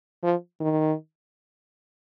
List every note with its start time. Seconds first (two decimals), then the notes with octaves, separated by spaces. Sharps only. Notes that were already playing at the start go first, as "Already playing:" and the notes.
0.23 F3
0.60 D#3